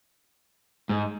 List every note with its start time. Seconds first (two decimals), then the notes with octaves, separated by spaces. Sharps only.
0.89 G#2